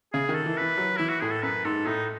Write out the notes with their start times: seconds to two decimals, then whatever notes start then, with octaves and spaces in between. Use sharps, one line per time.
0.13 C#3 G#4
0.29 D#3
0.35 A4
0.46 E3
0.57 E3 B4
0.78 F#3
0.97 E3 E4
1.09 F#4
1.21 A2 G#4
1.32 A4
1.43 F#2 B4
1.65 G#2 A4
1.86 A2 D#4